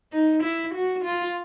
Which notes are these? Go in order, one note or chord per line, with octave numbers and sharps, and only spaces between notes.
D#4
E4
F#4
F4